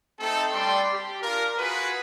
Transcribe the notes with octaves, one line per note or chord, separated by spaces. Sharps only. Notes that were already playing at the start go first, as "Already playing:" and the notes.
A3 C4 D#4 A4
G3 D4 D5 G5 C6
G4
D4 F4 A#4
F4 F#4 G#4 B4